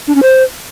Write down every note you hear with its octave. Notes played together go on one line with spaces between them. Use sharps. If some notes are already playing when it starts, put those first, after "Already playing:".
D4
C#4
C5